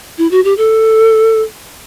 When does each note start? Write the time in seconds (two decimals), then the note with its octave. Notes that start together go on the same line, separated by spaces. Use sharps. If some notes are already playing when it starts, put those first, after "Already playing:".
0.18 E4
0.31 F#4
0.44 G4
0.57 A4